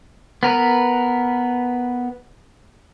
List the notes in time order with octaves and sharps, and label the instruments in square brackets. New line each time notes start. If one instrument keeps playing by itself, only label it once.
[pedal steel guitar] B3 A#4 B4